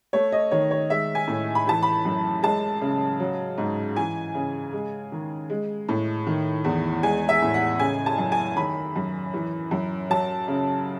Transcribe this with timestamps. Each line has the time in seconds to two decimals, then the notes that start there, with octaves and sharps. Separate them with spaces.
0.13 A3 C#5
0.32 D#5
0.51 D#3 C#5
0.71 C#5
0.90 G#3 E5
1.15 G#5
1.28 A2
1.55 B5
1.67 E3 A5
1.83 B5
2.05 F#2
2.43 G#3 A5
2.81 C#3
3.20 F#3
3.58 G#2
3.96 E3 G#5
4.35 C#3
4.73 G#3
5.12 D#3
5.50 G#3
5.89 A2
6.27 D#3
6.64 E2
7.03 G#3 G#5
7.29 E5
7.42 A2
7.54 F#5
7.79 C#3 G#5
8.06 A5
8.18 F#2
8.32 G#5
8.57 D#3 B5
8.96 F#2
9.34 E3
9.71 F#2
10.10 F#3 A5
10.48 C#3